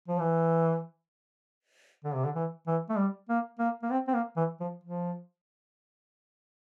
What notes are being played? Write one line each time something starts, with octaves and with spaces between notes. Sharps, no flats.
F3
E3
D3
C3
D3
E3
E3
A3
G3
A#3
A#3
A#3
C4
C4
A#3
E3
F3
F3